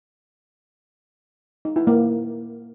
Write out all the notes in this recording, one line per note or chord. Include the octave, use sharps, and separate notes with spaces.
D#4
E4
A#3